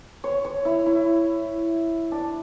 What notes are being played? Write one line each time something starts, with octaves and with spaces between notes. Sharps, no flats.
C#5
C#5
E4
E4
D4